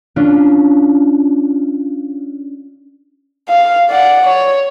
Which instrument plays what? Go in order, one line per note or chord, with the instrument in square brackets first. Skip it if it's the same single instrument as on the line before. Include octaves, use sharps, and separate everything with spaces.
[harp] C#4 D4 F4
[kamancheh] F5
D5 F#5
C#5